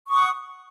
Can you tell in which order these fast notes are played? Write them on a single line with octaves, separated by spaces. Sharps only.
C#6 D#6 F#5